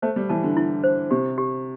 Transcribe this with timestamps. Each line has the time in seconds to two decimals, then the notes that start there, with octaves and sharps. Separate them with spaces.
0.02 A3 C5
0.16 G3
0.29 E3 A5
0.43 D3
0.57 E4
0.84 C5
1.11 C3 G4
1.38 G4